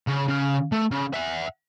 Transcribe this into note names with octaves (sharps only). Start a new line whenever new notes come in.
C#3 C#4
C#3 F5
A3
C#3
E5 F#5